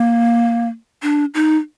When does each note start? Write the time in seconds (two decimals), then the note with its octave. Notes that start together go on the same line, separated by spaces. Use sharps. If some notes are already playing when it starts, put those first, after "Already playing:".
Already playing: A#3
1.02 D4
1.35 D#4